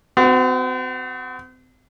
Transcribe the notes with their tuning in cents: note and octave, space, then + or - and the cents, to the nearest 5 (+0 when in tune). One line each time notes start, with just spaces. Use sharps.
C4 -40 F#4 +0